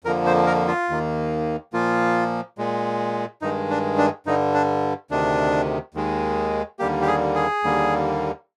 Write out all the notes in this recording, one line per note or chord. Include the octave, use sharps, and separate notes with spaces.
F2 D3 F3 A#3 A#4
C5
A#4
F4
D#2 D#3 A#3
A#2 F3 A#3 F4
A#2 G#3
G2 D#3 G#3 D#4
D4
D4
G2 D3 G3 D#4
D4
D2 C3 D#3 D4
D#2 D#3 G#3
D#2 D3 G3 A#3 G4
G4
G#4
G#4
D#2 D3 G3 A#3